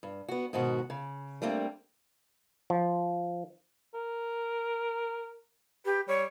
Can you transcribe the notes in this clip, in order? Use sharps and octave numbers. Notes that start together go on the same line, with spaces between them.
G2
B3 F#4
G#2 B2 D#3 F#4
C#3
G3 A3 A#3 C4 D4
F3
A#4
G4 B4
G3 C#5